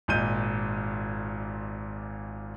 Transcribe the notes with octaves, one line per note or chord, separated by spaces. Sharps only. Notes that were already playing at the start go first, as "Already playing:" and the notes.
G#1 A#2 D#5 G6 D#7